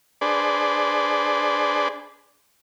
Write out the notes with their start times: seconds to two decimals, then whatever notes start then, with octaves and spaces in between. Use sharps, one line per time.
0.21 D4 G#4 B4 C5 D5